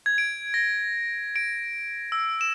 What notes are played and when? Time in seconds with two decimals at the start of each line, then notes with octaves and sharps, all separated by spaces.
0.06 G#6
0.18 D7
0.54 A#6
1.36 D7
2.12 E6
2.41 E7